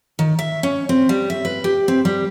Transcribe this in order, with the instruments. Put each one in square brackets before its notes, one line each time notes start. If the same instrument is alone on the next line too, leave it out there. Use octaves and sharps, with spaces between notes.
[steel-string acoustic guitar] D#3
E5
C#4
C4
G3
E5
B4
G4
C4
G3